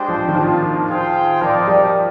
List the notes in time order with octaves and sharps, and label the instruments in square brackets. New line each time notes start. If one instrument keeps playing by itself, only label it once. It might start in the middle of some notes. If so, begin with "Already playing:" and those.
Already playing: [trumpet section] G#3 D4 G4 C5 G5
[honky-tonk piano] F3
D#3
[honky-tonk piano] F3 [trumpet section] A#3 D4 F4
[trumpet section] F4 G#4 C5 G5
[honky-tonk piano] F3 [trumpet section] D#4 A#4 D5 G5
[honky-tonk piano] G3